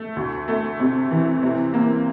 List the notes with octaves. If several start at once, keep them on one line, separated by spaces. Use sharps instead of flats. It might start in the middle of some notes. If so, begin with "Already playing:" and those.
Already playing: A3
D2
A3
C3
E3
C3
A#3